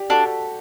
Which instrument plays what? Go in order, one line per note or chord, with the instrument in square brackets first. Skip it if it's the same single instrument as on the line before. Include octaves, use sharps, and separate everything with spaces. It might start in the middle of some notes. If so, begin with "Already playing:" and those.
Already playing: [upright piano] G4 D5
[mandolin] D4 [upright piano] F#4 A4